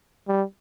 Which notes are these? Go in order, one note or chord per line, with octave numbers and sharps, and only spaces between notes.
G3